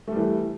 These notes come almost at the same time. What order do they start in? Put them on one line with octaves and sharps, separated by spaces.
A3 G3 E3